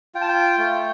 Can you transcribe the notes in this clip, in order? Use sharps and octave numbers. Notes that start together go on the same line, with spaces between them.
F4 G5
A5
G5
A3